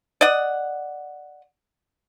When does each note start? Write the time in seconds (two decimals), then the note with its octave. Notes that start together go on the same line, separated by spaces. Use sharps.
0.21 D5 D#5 F#5